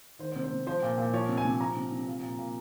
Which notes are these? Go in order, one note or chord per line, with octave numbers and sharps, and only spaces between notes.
D#3 C5
C5
C3
C5
C3
F3 C5
A#2
A#2
F3 C#5
C3
G#5
C3
F3 A#5
C3
C3
F3
A#2
A#2